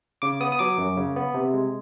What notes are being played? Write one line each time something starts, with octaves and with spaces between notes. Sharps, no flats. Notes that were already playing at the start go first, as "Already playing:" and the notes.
C#3 D6
B3 D#6
D#6
F#3 D6
F#2
C#3
B3
C3
G#3